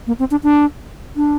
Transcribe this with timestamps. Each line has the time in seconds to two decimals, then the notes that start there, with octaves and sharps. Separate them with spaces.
0.07 A#3
0.19 C4
0.31 D4
0.43 D4
1.16 D4